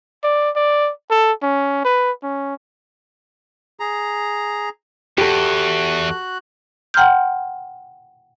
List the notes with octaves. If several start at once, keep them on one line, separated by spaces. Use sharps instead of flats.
D5
D5
A4
C#4
B4
C#4
G#4 A#5
E2 F#4 G4 A4 F#6
F#5 G5 A#5 C6 F6 G6